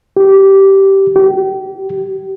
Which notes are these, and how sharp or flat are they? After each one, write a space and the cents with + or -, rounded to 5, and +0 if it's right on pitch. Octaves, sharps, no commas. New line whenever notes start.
G4 -15
G4 -35